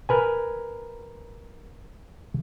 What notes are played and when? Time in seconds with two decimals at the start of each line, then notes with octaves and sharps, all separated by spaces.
0.09 A#4 B4 G#5